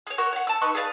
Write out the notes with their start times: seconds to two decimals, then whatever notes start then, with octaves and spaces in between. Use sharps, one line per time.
0.07 G#4 C#5
0.18 F#4 A#4 C#6
0.33 C#5 F#5
0.47 A5 E6
0.62 D#4 B4 C#6
0.75 G#4 B4 D5 F5